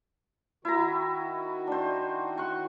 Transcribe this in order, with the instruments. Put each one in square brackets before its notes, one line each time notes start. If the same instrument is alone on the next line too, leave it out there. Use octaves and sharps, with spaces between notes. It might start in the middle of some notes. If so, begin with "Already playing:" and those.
[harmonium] D#3 F#4 [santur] E4 A#5
[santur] D4 C5
F#5 C6 C#6